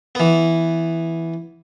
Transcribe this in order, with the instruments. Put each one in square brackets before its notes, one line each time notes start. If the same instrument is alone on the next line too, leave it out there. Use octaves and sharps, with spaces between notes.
[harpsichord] E3 B3